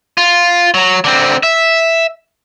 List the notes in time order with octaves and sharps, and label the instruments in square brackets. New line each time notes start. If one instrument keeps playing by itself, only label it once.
[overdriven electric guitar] F4
F#3
D3 C4
E5